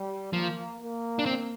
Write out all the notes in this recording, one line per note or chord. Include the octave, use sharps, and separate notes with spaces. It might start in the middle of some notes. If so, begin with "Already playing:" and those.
Already playing: G3
F3 A#3
A#3
D4
C4